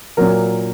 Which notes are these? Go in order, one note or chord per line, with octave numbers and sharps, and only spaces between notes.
A#2 F#3 A#4